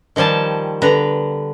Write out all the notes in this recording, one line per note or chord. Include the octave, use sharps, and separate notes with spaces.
D#3 F3 G3 G#5 A5
D3 B3 B4 A#5